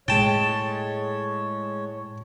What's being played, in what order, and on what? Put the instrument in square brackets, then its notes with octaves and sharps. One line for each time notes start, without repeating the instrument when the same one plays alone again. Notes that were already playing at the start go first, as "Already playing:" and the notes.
[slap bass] A2 [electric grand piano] G#3 A6 [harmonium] C#5 [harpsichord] G5 A5